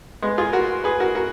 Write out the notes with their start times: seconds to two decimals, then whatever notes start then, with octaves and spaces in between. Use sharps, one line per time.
0.23 G#3 B3
0.38 F4 G#4
0.53 F#4 A#4
0.84 G#4 B4
1.00 F#4 A#4
1.15 F#4 A#4